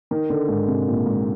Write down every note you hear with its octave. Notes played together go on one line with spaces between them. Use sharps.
D#3
D3
G#2
C3
A#2
G#2